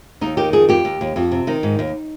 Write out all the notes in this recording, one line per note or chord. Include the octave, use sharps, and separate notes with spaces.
D#2 D#4
D#3 G4
F2 G#4
F2 G4
D#2
D#2
F2
C3
D#3 D#4
G#2
D#2